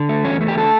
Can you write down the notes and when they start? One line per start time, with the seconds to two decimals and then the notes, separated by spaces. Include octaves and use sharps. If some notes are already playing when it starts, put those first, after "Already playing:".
Already playing: D3
0.09 A3
0.24 E2 C#4
0.41 A3
0.48 G4
0.57 D3 A4